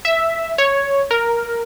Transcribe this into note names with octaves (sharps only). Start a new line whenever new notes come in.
E5
C#5
A#4